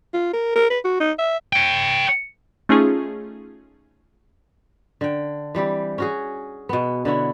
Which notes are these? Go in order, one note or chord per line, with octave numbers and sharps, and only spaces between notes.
F4
A#4
A#4
B4
F#4
D#4
E5
C#5 G5
A3 C#4 D#4 F4 G#4
D3 G5
E3 G3 C4 G4
C#4 F#4 G#4
B2 B3
D3 B3 E4 C#5